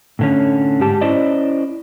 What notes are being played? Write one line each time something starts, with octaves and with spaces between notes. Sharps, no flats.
A2 D3 C#4
G#2 G4 A5
C#4 E4 C5 D5 D#5